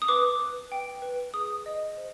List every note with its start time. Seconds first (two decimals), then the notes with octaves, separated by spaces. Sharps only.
0.02 D#6
0.08 B4 D6
0.40 B4
0.72 G5
1.02 B4
1.33 G#4 D#6
1.66 D#5
1.97 C5